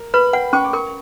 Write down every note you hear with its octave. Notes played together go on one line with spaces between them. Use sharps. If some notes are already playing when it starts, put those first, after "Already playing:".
Already playing: A#4
B4 B5
F#5 G5
C#4 C#6
D6
A#4 C#6